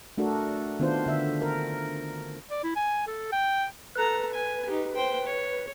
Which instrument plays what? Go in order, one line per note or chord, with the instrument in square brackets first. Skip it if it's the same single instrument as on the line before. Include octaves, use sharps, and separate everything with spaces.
[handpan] A3 D4 F#4 A4 A#4
D#3 B3 D4 F4 C5
D3 E5
A#4
[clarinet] D5
E4
G#5
A4
G5
[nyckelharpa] A4 A#5 [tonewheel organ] B4
[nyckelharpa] G#5
D#4 G4
C5 G5
C#5